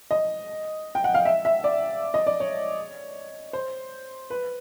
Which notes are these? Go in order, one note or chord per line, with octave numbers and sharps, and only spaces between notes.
D#5
G5
F#5
F5
E5
E5
D5
D#5
D5
C#5
C5
B4